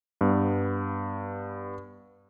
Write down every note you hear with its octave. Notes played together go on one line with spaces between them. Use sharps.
G2 B3